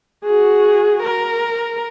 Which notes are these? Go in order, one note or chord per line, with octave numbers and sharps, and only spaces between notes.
F#4 G#4
A#4